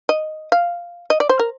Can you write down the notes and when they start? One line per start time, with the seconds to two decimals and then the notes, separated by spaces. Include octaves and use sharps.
0.09 D#5
0.52 F5
1.10 D#5
1.20 D5
1.29 C5
1.39 A#4